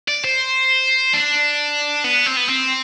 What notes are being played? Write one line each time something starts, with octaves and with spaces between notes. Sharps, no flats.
D5
C5
D4
B3
C4
B3
C4